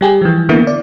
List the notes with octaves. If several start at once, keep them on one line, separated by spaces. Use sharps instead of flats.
G3 G4 G#4
E3 F3
D3 E3 A#3 B3 E4
D5